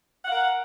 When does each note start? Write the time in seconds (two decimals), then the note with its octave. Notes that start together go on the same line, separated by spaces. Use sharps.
0.25 F#5
0.28 F5
0.32 A#4